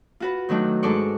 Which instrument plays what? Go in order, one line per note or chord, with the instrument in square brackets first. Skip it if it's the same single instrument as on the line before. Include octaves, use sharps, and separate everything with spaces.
[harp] F4 F#4 B4
D#3 F#3 A3 D4
G#2 D4 A4 D5 C#6